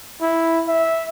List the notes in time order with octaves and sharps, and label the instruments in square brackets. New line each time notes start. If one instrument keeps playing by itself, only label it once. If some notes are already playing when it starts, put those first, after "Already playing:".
[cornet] E4
E5